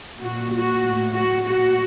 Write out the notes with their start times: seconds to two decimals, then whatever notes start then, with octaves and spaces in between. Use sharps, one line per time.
0.21 A#2 F#4
0.53 F#4
0.84 A2
1.15 F#4
1.46 A#2 F#4